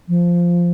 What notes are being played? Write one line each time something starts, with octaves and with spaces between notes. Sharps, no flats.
F3